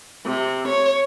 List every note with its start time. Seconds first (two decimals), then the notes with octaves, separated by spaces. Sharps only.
0.24 C3
0.67 C#5